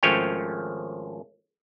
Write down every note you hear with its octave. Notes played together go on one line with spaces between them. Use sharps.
G#1 F3 A3 C#4 C#5 G5